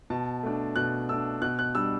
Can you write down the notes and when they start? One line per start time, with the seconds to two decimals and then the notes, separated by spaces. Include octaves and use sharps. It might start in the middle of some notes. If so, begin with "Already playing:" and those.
0.10 B2 A5
0.43 A3 D4
0.76 B2 F#6
1.09 A3 D4 E6
1.42 B2 F#6
1.59 F#6
1.75 G3 D4 E6